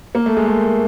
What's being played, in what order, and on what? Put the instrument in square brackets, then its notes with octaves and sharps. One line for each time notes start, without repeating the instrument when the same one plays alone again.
[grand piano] A#3
A3
G#3
A3